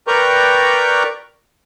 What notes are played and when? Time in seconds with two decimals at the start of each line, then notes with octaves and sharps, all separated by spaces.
0.08 A#4 B4 D5 G5 A#5 C#6